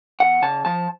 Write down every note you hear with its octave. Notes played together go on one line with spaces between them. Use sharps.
E2 F#5
C#3 A5
F3 A5